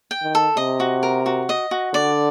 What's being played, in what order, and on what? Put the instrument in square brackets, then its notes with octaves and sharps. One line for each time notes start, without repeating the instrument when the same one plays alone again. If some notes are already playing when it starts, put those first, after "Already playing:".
[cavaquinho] G5
[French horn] D#3
[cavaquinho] A4
[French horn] C3 [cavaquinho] D#5
[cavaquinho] F#4
A#4
F#4
D#5
F#4
[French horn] D3 [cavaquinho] D5